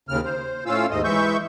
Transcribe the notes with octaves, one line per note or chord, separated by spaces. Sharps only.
D#2 C#3 F6
C5
A2 C#4 F4 F5 E6
D#2 G#2 D#5
E3 G#3 E5 C#6 G6